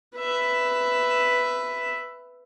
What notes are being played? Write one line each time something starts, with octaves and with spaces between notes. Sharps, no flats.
B4 E5